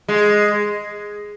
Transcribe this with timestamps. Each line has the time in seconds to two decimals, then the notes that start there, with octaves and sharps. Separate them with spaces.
0.08 G#3